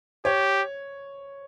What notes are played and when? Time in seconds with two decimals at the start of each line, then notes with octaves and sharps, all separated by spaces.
0.25 G4 C#5